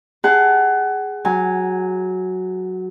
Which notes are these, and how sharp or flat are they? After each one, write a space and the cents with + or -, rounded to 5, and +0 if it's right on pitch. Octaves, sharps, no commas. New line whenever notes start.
G#4 +0 F#5 +25 A5 +0
F#3 +0 G#5 +0